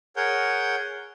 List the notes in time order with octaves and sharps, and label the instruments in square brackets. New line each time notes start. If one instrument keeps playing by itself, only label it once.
[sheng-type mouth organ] G#4 A#4 C#5 F#5 G6